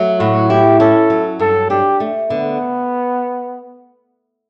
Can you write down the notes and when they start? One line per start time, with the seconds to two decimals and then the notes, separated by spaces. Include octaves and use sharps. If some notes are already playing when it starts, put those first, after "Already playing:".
Already playing: F#3 A3
0.19 A2 F#4
0.50 E4 G4
0.80 C#4 A4
1.10 F#3
1.39 G2 A4
1.70 D4 G4
2.00 A3
2.30 D3 B3